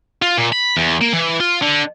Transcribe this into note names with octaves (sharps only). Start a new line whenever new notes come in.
F4
A#2
B5
E2
A#3
E3
F4
D3